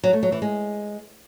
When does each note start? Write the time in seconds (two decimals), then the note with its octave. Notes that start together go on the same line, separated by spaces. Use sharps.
0.04 F#3
0.13 A3
0.23 F#3
0.32 E3
0.42 G#3